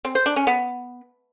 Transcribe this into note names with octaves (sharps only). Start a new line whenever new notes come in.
C4
C5
D4
C#4
B3